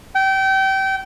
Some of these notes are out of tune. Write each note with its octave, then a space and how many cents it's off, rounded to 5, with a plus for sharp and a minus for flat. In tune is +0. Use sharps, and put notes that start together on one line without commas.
G5 -25